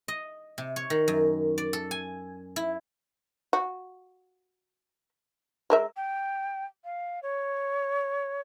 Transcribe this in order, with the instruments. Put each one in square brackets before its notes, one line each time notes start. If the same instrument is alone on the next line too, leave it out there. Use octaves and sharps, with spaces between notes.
[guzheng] D#5
C3
C#5
D#3
F#2
D5
A4
G#5
E4
[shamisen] F#4
G#3 A#4 E5
[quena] G5
F5
C#5